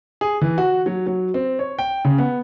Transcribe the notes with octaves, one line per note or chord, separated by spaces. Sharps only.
G#4
E3
F#4
F#3
F#3
C4
C#5
G5
C#3
B3